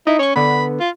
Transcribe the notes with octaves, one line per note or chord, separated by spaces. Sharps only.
D#4 E4
C#4 C#5 C#6
D3 B3 B5
F4